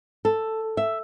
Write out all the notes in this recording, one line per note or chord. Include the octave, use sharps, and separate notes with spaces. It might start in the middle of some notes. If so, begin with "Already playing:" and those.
A4
E5